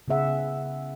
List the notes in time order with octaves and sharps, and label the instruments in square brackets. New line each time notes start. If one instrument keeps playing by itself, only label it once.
[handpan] C#3 B3 G#4 E5 F#5